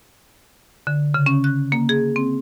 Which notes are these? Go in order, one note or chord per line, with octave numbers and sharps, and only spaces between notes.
D3
C#3
C#4
F#6
A#3
G#4
C4